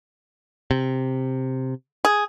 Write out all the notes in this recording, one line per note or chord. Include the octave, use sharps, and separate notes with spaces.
C3
G#4